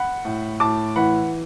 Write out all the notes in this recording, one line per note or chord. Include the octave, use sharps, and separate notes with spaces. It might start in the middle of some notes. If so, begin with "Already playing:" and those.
Already playing: F#5 B5
A2
A2 A5 D6
E3 F#5 B5